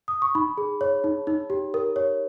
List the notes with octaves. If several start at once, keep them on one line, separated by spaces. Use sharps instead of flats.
D#6
C#6
D#4 B5
G#4
C#5
D#4
D#4
G4
A#4
C#5